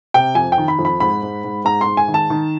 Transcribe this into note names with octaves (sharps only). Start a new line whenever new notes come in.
C3 G5
F2 G#5
G5
D#3
B5
F2
B5
G#2 B5
G#2
G#2
G#2 A#5
C6
G#2
G#5
D#3
A5
D#3